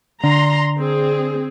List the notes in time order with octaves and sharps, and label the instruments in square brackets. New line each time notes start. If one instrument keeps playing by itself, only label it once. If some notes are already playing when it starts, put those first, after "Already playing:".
[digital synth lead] D3 [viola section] A#5 C6
[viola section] C4 G#4